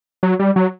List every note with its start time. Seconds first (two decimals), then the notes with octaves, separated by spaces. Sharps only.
0.23 F#3
0.39 G3
0.56 F#3